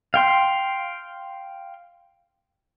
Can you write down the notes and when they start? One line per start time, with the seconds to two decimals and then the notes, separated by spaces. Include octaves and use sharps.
0.14 F5 G5 C6